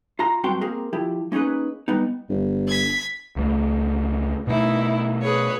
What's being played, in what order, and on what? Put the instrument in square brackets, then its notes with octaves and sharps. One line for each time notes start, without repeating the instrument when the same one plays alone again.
[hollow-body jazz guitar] F4 A#5
G2 F#3 C4 F#4 G5 C6
A#3 C4 G#4 A#4
F3 E4 G4
A#3 C#4 D#4 G#4 B4
G3 B3 D#4
[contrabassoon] G1
[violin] G#6 B6
[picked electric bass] C#2 A3
[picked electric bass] B2 A3 [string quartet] D#4 E4
[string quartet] G#4 B4 C#5